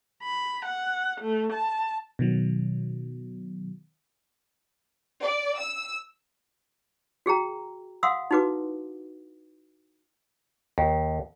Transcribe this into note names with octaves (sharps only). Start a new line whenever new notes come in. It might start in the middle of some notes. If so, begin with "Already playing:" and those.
B5
F#5
A3
A5
B2 D#3 F#3
D5
E6
F#4 G#4 G5 A#5
F5 F#5 C6 D#6 E6
D#4 E4 F#4 B4 D6
D#2